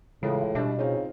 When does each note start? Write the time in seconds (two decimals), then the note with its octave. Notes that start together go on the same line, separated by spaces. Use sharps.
0.23 A2 C#3 E3 G#3 F4
0.55 B2 G3 D4 E5
0.78 C#3 C4 D#4 F4